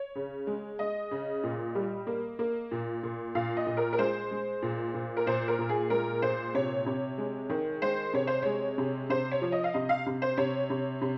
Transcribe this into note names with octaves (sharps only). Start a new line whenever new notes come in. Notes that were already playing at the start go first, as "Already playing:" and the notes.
Already playing: C#5
C#3
G#3
G#3 D#5
C#3
A#2
G3
A#3
A#3
A#2
A#2
A#2 F5
D#5
A#2
A#4
A#4
G#3 C5
G#3
A#2
A#2
A#4
A#2 C5
A#4
A#2
G#4
G#3 A#4
A#2 C5
C3 C#5
C3
G#3
D#3
G#3 C5
C3 C#5
C5
G#3 C#5
C3
C3 C5
C#5
F3
D#5
F5
C3 D#5
F5
C3
C5
C3 C#5
C3
C3